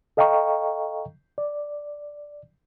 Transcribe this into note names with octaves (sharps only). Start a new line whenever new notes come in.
A4 D#5 F5 G5 A#5 C#6
D5